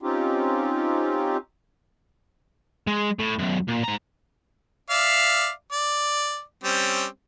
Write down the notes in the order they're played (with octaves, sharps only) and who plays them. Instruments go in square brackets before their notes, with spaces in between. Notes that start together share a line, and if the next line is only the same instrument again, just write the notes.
[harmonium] C4 C#4 D#4 F4 G4
[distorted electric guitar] G#3
A2
B1 F#2
A#2
G#2 A#5
[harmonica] D5 E5 F5
D5
G3 C4 C#4